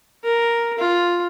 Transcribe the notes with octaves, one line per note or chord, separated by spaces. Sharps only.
A#4
F4